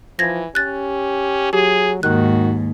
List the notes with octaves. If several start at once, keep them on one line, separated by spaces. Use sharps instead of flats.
E3 F3 G#6 A#6
C#4 G4 F#6 A6
F#3 G4 G#4
D#2 G#2 D#3 F#4 F#6